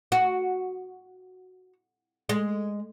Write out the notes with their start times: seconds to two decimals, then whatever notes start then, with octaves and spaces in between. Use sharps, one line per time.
0.12 F#4
2.29 G#3